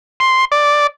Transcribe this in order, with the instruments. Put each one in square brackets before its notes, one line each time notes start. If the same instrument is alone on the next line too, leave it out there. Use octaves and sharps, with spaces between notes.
[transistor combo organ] C6
D5